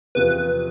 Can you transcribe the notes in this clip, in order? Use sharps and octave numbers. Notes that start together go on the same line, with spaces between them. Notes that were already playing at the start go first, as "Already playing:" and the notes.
E2 C3 F3 B4